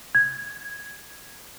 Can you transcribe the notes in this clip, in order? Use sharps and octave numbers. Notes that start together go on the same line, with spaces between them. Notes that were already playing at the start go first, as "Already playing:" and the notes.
G#6